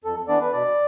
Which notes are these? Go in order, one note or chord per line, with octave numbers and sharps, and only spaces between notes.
F2 A4
E3 B3 D4 D5
B4
B2 D5